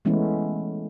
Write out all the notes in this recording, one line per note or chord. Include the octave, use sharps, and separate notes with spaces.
E3 G#3 A3 B3 C#4 E4